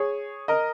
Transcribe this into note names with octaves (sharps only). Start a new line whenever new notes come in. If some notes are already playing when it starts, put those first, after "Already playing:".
Already playing: G#4 C#5
A#4 D#5